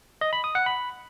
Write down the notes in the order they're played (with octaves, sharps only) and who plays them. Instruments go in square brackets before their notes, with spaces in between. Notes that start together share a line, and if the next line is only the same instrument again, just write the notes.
[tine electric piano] D#5
B5
D#6
F#5
B5